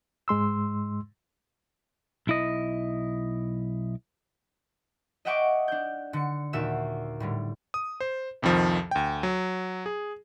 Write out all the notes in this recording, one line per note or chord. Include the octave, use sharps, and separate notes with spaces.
G#2 G#3 C6 E6
B1 E4 D#5
D#5 E5 F#5 G5 C#6 D6
D4 G6
D3 C#7
D#2 A#2 F#4 E5 E6
A2 D3 G3
D#6
C5
C2 F2 D#3 F3
D2 G5
F#3
G#4